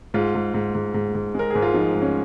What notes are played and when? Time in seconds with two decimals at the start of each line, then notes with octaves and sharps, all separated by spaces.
0.14 G#2 F4
0.35 G#2
0.54 G#2
0.75 G#2
0.94 G#2
1.15 G#2
1.34 G#3 A#4
1.50 G#2 G#4
1.62 F4
1.74 F3 D#4
1.95 G#2
2.02 C#4